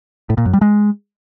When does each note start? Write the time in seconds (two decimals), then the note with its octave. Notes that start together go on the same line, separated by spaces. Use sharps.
0.30 A2
0.38 A#2
0.46 F#2
0.53 G3
0.61 G#3